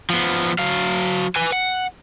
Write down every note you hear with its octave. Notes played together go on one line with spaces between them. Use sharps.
F3 B3
F#3 F5
B4 G#5
F#5